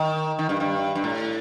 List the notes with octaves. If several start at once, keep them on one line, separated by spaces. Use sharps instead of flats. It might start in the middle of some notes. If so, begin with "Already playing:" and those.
Already playing: D#3
D#3
G2
G2
G2
A2